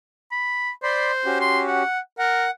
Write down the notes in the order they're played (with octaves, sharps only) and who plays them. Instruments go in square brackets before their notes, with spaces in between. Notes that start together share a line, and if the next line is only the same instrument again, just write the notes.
[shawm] B5
[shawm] C5 [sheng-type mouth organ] D5 B5 C6
[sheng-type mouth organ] C#4 F#4 G4
[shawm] C6
F#5
[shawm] A#4 [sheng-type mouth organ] F#5